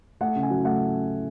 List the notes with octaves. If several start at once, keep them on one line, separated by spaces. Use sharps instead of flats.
A3 F#5
C#3
G#5
F#3
A3 F#5